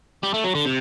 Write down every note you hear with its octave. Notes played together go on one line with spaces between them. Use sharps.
G3
A3
F#3
D3
C3